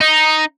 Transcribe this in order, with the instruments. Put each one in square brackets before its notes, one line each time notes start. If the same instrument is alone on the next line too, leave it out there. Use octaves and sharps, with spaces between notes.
[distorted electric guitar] D#4